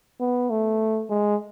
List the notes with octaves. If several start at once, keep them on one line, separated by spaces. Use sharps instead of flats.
B3
A3
G#3